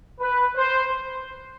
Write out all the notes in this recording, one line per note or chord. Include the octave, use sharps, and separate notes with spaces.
B4
C5